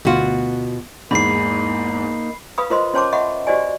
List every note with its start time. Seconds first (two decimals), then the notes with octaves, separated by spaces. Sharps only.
0.05 D2 B2 F4 F#4
1.11 E2 G#2 A#3 D#4 B5 C7
2.58 B4 F5 B5 D#6
2.70 F4 A#4 C5 D#5 B5 C6
2.94 C#4 C5 C#5 A5 C6 D6
3.13 D#5 E5 F#5 B5 C#6
3.47 F#4 G4 C5 D5 D#5 G#5